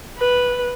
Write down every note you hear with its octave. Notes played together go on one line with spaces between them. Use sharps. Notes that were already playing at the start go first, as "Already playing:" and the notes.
B4